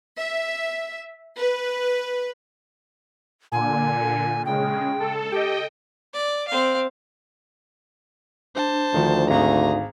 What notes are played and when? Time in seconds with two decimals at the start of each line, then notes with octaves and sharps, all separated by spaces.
0.19 E5
1.35 B4
3.52 A#2 D3 G#5
4.45 C#3 G#3 G5
5.00 A4
5.32 G4 D#5 G5
6.14 D5
6.48 C4 F5
8.55 D4 C5 A5
8.94 D2 D#3 F3
9.30 G#1 D#4 G#4 F5 A#5